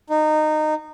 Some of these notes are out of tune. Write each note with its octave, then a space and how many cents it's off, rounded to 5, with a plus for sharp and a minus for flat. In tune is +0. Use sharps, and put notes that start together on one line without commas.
D#4 -20